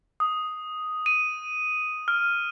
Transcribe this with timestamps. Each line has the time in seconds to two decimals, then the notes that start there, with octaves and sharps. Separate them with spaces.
0.20 D#6
1.06 D#7
2.08 F6